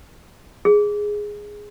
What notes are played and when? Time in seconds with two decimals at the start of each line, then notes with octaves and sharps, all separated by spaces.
0.65 G#4